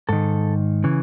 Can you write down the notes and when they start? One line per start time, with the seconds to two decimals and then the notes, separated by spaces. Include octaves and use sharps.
0.09 G#2 D#3 A4
0.84 C#3 E3